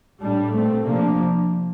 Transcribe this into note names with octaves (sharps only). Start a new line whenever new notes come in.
A2 G3 D4
A#2 A3 C4
C3 F3 A#3 D4